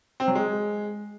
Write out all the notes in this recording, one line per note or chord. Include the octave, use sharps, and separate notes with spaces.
C4
F#3
G#3